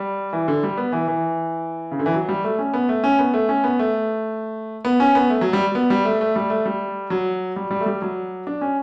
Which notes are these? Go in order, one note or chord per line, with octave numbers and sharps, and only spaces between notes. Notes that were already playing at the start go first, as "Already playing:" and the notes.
Already playing: G3
E3
D3
G3
B3
E3
E3
C#3
D3
E3
F#3
G3
A3
C#4
B3
A3
C#4
B3
A3
C#4
B3
A3
B3
C#4
B3
A3
F#3
G3
B3
G3
A3
A3
G3
A3
G3
F#3
G3
G3
A3
G3
F#3
D4
C#4